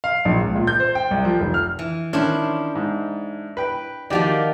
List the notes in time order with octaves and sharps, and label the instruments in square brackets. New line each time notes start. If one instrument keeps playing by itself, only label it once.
[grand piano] F5
A#1
C#2
A#2
G6
C5
G5
C2
F3
F1
F6
[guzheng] E3
[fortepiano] D#3 C#4 [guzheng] D4 E4 C5
[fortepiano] G#2
B4 G5
[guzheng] D#3 F3 A#3 [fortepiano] F#4 G4 D5